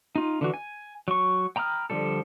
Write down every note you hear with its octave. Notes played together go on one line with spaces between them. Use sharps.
D#4 F4
D3 E3 F#4
G#5
F#3 C#6
G5 A#5 B5 D#6 F6
D3 F3 G3 A4